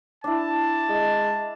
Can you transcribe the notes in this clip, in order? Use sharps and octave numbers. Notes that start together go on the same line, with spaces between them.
D4 E4 A5
G#3